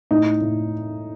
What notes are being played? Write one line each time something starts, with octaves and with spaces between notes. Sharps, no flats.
A2 D#4
A2